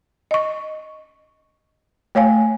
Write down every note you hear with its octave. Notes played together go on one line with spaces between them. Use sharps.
D#5 C#6
A3 C#5 F5 G#5